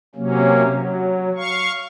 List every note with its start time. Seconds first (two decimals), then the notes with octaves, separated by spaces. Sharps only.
0.15 C3 F#3 A#3 C#4
0.71 F#3
1.37 F5 C#6